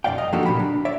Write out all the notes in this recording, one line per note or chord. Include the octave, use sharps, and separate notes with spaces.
B1 F#2 G3 D5 F5 G5
D#5 F5
F3 A#3 D4 F#4 G4 A4
A#2 C#3 F#3 B5
D4
C#5 D5 E5